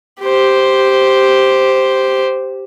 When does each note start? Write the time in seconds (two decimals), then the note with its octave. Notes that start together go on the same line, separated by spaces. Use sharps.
0.21 G4 C5